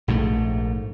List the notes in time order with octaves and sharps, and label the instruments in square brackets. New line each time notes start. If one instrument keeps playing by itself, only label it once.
[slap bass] A#1 G#2 D3 A3